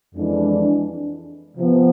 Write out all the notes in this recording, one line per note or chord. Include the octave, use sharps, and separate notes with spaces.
F2 E3 G#3 D4
C3 F3 B3